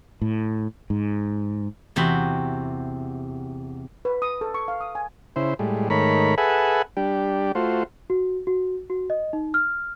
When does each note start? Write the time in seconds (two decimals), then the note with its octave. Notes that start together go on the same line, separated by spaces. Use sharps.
0.22 A2
0.90 G#2
1.96 E2 C3 F#4 G4 B5
4.05 B4
4.22 D#6
4.41 A4
4.54 C#6
4.68 F5
4.81 D#6
4.95 G#5
5.36 C#3 E4 C5
5.59 A2 G3 G#3
5.90 G#2 D#3 A3 A#4 C#5 B5
6.38 G#4 A4 B4 E5 F#5 G#5
6.97 G3 D4 G4
7.55 A3 F4 F#4 C5
8.10 F#4
8.47 F#4
8.90 F#4
9.10 D#5
9.33 D#4
9.54 F6